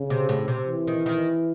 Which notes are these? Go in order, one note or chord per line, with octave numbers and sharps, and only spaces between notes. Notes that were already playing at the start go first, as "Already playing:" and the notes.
Already playing: C#3
C3
A2
C3
E3
D#3
D#3